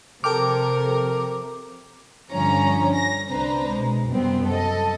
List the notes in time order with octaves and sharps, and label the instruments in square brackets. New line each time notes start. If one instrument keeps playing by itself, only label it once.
[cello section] C3 F3 [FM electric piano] A4 G5 F6 [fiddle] A#4 [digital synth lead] D6
[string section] G2 D3 F3 C#4 A#5
A#6
C2 C4 D4 B4 C5 A#5
B2 G#3
F#2 C3 G3 B3 C4
A4 D#5